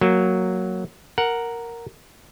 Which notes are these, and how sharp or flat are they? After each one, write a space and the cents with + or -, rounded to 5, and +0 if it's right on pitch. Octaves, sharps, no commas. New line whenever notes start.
F#3 +0 A#3 -10
A#4 +0 F#5 +0